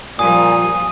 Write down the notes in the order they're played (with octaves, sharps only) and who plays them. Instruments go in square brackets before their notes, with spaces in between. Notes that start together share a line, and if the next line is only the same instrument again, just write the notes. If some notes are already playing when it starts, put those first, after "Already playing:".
[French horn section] A#2 [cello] F3 G3 [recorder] G#5 [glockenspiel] D#6